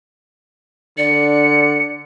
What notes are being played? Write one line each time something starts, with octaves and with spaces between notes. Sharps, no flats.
D3 D5 C#7